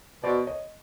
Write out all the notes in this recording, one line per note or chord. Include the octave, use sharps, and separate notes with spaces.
B2 C5 D5
C#5 D#5